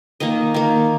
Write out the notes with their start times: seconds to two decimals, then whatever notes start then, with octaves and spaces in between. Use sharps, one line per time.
0.20 D#3 A#3 D#5
0.54 D#3 A#3